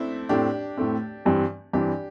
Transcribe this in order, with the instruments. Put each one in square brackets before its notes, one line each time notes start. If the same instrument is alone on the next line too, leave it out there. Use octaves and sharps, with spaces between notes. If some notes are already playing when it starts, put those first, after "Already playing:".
Already playing: [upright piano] A3 C4 D4 E4
[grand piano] A2 A3 C4 [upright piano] D4 G4
[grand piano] A2 A3 C4
G2 E3 C4
[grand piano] G2 E3 C4 [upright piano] D4 G4